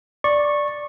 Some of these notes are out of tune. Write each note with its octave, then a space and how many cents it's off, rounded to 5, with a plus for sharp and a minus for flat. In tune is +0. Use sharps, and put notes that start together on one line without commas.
D5 +0 C#6 -15